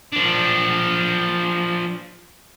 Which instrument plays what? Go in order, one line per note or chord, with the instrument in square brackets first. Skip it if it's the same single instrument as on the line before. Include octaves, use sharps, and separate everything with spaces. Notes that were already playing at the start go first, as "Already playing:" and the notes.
[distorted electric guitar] F3 D4